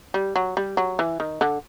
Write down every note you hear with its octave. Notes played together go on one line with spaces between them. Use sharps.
G3
F#3
G3
F#3
E3
D#3
D3